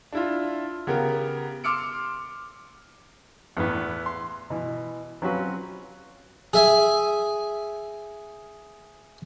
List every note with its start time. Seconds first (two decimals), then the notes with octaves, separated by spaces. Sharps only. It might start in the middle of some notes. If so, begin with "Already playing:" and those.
0.12 D4 E4 F4
0.87 C#3 B3 G4 A#4
1.64 C6 D6 E6 F6 C#7 D7
3.57 E2 A2 B3
4.06 C6
4.50 B2 E3
5.22 F#3 C4 C#4 F4 F#4 B4
6.53 G#4 E5 G#5